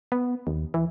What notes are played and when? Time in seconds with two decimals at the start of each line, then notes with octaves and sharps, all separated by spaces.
0.12 B3
0.47 D#2
0.74 E3